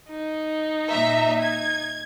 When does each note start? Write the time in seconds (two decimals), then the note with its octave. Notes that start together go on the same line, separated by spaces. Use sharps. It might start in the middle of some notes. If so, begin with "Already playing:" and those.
0.10 D#4
0.89 A#2 E5 A#5
1.41 G#6